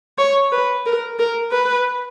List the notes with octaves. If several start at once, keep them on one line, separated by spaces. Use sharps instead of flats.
C#5
B4
A#4
A#4
B4